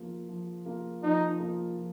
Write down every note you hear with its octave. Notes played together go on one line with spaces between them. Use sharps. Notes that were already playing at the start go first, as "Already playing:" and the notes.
Already playing: F3 A#3 F4
F3
A#3 F4
F3 D#4
A#3 F4
F3